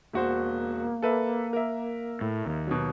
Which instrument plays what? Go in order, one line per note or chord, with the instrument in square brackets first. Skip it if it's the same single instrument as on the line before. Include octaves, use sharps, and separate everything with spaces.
[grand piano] E1 F#4 C5 [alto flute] A#3
[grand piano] A4 B4 E5
A#4 E5
[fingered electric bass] A2
D#2
[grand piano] B2 F#3